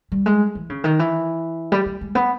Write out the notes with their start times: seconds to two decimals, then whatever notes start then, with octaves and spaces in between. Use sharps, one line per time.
0.12 G3
0.26 G#3
0.55 E3
0.70 C#3
0.84 D#3
0.99 E3
1.72 G3
1.86 G3
2.01 G#3
2.15 B3